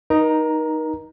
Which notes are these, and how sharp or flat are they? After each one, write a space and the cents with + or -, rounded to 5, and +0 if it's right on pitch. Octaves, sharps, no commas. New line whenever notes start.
D#4 +0 A#4 +35 A#5 +0